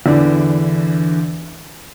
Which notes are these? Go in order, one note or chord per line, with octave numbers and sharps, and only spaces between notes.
E2 D3 E3 D4